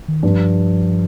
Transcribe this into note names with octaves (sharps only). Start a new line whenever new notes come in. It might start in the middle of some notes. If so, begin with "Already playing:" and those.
D#3
G2 F3